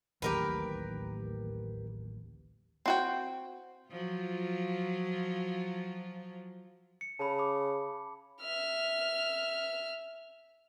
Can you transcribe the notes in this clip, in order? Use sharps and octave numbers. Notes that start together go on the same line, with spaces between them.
D1 A1 D#2 G4 A#4 B4
C4 F#4 G5
F3 F#3 F4
C#7
C#3 A5 B5
B5 D6
E5 F6